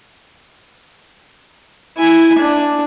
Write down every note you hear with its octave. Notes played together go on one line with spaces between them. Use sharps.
E4 G#5
D4